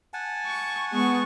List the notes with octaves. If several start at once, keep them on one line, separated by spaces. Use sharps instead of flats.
F#5 G#5 A5
C#6
G#3 B3 C#6